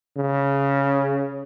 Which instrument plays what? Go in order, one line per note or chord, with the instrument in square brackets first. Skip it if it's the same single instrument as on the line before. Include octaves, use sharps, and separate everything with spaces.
[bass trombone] C#3